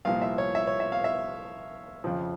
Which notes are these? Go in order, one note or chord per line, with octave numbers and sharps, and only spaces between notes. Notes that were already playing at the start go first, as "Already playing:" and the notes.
C2 A#2 F3 F5
E5
C#5
E5
C#5
E5
F5
E5
F2 C#3 F3